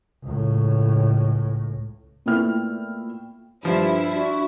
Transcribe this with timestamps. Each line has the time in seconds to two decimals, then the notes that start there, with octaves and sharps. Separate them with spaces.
0.24 C#2 A2
2.26 A#2 A3 B3 E4 G5 F6
3.65 G2 F3 E4
4.15 D4 F#4